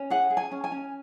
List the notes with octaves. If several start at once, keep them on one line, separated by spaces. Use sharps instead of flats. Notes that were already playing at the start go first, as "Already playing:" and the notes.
Already playing: C#4
G#4 F#5
G#4
G#5
C#4
G#5
C#4